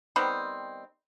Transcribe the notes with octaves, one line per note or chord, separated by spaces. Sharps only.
D#3 G3 B3 C4